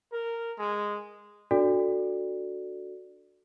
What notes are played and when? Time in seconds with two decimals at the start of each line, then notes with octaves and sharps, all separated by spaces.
0.12 A#4
0.59 G#3
1.51 D4 F#4 A4 D5